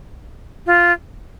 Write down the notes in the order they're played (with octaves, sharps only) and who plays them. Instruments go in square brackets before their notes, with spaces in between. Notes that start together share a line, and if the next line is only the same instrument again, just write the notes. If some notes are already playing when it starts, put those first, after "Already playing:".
[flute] F4